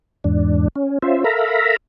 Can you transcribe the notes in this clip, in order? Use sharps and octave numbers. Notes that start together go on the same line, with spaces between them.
E2 G#2 D4
C#4
C#4 F4 C5 E5
A4 A#4 E5 F5 A#5 B5